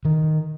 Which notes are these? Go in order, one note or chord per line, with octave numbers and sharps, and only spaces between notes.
D#3